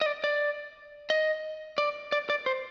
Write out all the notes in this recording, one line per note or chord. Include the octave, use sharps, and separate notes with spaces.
D#5
D5
D5
D#5
D5
D5
D5
C5